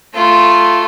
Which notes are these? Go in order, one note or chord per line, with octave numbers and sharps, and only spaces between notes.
A3 F4